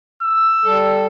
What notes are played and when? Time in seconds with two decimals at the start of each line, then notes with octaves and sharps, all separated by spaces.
0.22 E6
0.65 G3 A4